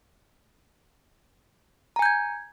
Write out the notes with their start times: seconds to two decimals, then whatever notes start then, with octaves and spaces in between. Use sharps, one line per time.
1.96 A#5
1.99 G#5
2.02 G6
2.05 G#6